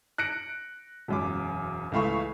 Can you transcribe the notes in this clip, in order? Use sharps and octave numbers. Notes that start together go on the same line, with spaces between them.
F#6 A#6 C#7 D7
E1 F#2 D6
C#2 E3 A3 F5 B5 C#6